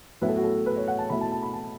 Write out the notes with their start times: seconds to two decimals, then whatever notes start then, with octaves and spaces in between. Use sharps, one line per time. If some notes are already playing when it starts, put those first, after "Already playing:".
0.21 A2 F#3 B3 E4 B4
0.28 A4
0.36 F#4
0.44 A4
0.66 B4
0.76 C#5
0.88 F#5
0.99 A5
1.10 B2 A3 E4 B5
1.21 A5
1.32 A5
1.43 B5
1.53 A5